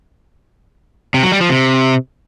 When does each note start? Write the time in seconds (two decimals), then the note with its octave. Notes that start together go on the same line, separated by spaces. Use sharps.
1.14 C3
1.23 F#3
1.32 G3
1.41 F3
1.50 C3